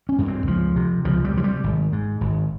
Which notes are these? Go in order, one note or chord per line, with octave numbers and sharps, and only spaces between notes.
C#4
G2
C4
C#2 F3
C3
C#2 F3
G3
C3 F3
G3
G#1
G#2
G#1